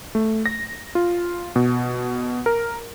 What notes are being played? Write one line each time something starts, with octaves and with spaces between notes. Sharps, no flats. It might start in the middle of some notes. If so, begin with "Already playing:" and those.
A3
A#6
F4
B2
A#4